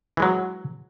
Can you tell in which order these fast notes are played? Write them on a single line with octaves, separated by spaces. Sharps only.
E3 G#3 F#3